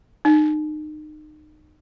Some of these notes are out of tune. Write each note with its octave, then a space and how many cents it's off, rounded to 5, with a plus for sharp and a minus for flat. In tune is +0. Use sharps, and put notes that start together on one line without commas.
D#4 -30